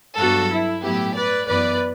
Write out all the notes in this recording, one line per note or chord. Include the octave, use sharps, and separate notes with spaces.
G2 F#3 B3 F#4 A4
E4
A2 F#3 B3 E4 G4
B4 D5
F#2 E3 B3 B4 D5